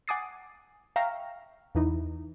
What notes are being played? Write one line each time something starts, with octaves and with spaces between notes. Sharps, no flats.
F#5 G#5 D6 D#6 A6 C7
E5 F5 G5 A#5 C#6 F6
E2 E3 D#4